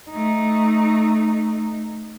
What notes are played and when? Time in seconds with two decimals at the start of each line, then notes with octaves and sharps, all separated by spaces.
0.11 A3 D#4